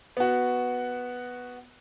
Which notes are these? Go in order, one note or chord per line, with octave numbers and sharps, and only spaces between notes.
B3 F#4